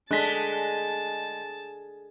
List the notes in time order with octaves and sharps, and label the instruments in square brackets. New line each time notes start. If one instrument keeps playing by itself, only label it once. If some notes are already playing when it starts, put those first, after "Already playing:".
[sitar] G#3 [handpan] D4 G#4 A4 [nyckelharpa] A5 [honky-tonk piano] F#6 B6